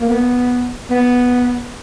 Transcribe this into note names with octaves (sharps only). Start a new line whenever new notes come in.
A#3
B3
B3